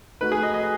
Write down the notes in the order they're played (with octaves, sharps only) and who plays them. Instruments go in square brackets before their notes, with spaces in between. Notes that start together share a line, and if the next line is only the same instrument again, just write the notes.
[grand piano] A3 D#4 F#4 [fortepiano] B4
[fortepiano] G#4
D#5
D#5